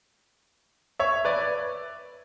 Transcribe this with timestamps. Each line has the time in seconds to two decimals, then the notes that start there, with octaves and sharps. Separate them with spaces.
0.99 C#5 E5
1.25 B4 D5